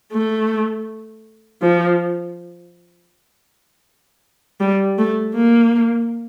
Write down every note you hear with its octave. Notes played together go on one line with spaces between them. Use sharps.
A3
F3
G3
A3
A#3